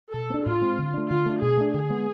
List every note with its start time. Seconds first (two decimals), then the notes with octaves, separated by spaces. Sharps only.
0.14 B2 A4
0.30 B3
0.34 D4
0.45 A2 F4
0.61 G#3 C4
0.78 D3
0.94 A3 D4
1.10 D3 F4
1.26 A3 D4
1.42 B2 G#4
1.58 A3 D4
1.74 D3 G#4
1.90 G#3 B3